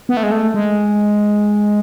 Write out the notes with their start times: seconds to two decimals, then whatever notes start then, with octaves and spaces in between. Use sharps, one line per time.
0.09 B3
0.17 A3
0.23 G#3
0.31 A3
0.54 G#3